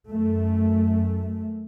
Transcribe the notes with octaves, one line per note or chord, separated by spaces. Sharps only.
F#2 A3